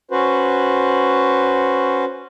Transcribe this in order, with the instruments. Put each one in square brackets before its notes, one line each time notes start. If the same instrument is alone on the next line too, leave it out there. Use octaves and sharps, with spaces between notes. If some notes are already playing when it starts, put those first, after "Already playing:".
[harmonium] C#4 F#4 B4 C5